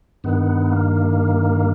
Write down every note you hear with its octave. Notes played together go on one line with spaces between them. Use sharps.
G2 D#3 B3
A#3